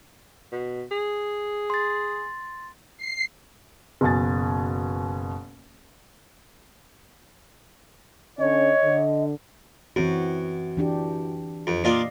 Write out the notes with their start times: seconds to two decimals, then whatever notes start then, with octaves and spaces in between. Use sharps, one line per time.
0.52 B2
0.91 G#4
1.70 C6 A6
2.98 C7
4.01 F#1 B2 G#5 A6
8.39 D3 C#4 C#5 D#5
8.83 D3
9.96 F#2 E3 C4 F#4
10.77 E3 D4 G4
11.67 F2
11.84 A#2 D4 F4 D5 D#5 F5